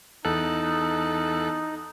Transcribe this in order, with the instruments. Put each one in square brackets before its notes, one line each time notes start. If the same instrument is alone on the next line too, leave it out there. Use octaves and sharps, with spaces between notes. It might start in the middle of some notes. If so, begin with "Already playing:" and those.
[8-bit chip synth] E2 A4 F#6 [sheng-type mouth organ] D#4